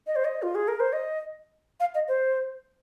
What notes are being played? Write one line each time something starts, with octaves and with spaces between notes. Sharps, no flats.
D#5
C5
D#5
F4
G#4
A#4
C5
D#5
F5
D#5
C5